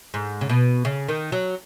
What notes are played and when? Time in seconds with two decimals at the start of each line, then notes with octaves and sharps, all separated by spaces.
0.14 G#2
0.41 C#3
0.50 B2
0.85 C#3
1.09 D#3
1.32 F#3